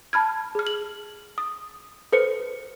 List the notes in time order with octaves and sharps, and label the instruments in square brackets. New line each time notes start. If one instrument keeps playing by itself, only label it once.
[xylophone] A5 B5 F6 G#6
G#4 F6
F#7
D#6
A4 B4 C5 C#7